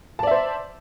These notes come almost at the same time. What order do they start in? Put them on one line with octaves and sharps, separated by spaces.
A5 D5 E5 C5